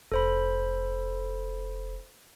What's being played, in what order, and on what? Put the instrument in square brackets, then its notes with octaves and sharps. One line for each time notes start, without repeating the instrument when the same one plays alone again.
[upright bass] F1 [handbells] A4 C5 B5